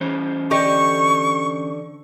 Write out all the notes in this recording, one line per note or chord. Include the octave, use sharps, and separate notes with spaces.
E3 C#4 C5
D3 G4 D#5 C#6